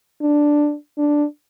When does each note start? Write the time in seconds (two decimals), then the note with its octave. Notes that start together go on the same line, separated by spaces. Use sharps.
0.21 D4
0.98 D4